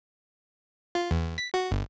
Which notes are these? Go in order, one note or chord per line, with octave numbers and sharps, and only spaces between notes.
F4
E2
B6
F#4
G1